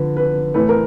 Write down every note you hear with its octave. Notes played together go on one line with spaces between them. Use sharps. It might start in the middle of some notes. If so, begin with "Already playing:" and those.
Already playing: D3 F3 B4
B4
A2 E3 A3 B4
A#4